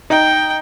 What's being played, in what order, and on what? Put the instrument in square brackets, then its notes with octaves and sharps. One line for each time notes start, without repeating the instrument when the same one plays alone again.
[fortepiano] D#4 [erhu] G5